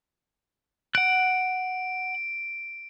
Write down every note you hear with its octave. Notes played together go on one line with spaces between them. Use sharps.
F#5 F#6 D7